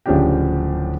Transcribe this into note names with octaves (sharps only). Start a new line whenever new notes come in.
D1 C#3 F3 D4 G4 G5